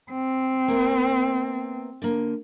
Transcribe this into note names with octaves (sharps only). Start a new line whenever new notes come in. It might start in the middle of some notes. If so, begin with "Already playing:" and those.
C4
A#3 B3 E5
D3 A#3